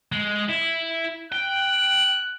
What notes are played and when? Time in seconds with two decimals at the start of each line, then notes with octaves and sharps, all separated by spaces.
0.12 G#3
0.49 E4
1.32 G5 F#6